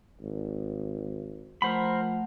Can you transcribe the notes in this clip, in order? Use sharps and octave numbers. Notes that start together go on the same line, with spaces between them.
G#1
F3 A3 A#4 C5 F#5 B5